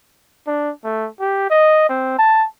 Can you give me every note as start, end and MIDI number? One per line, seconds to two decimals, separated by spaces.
0.47 0.71 62
0.84 1.08 57
1.20 1.47 67
1.50 1.86 75
1.89 2.14 60
2.19 2.45 81